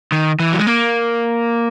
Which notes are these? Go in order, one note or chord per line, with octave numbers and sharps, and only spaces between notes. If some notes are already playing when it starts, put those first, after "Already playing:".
D#3
E3
F#3
G#3
A#3